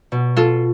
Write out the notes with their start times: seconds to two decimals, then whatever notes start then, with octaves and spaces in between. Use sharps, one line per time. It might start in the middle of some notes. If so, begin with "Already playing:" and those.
0.12 B2
0.36 F4 A4